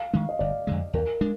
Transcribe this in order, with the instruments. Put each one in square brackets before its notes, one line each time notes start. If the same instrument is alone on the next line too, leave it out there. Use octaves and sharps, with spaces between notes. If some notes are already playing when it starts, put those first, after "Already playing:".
Already playing: [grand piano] F5
[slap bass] D#3 G#3 D4
[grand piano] D#5
[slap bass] G1 [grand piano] D5
[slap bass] F2 D3 G#3
[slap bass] D#2 [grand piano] A#4
[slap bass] G#3 D4